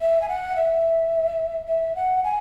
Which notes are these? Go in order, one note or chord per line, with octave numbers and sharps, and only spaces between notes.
E5
G#5
F#5
E5
E5
F#5
G#5